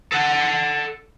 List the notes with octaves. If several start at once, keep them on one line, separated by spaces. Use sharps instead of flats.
A4 F#5